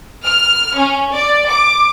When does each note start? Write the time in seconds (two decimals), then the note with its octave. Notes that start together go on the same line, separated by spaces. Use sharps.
0.23 F6
0.75 C#4
1.11 D5
1.47 D6